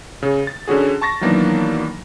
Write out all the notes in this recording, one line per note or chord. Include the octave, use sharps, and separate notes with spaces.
C#3
A6
D3 C#4 F#4 G#4
A5 C#6 A6 A#6
D#3 E3 F#3 A#3 B3 D4